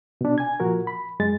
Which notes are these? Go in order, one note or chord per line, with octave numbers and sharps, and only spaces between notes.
B2 D4
G#5 G#6
A#2 F3 F#4 A#4
B5
F#2 G#3 A6